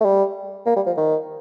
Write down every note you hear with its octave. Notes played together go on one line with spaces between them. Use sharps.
A3
G3
A#3
G3
F3
D#3